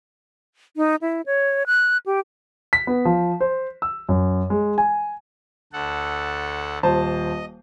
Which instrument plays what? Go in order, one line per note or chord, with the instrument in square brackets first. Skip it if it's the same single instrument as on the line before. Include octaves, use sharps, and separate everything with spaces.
[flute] D#4
E4
C#5
F#6
G4
[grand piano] B6
B3
F3
C5
E6
F#2
G#3
G#5
[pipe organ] D2 A4 F#5
[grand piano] D#1 C5 A5 [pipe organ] D#5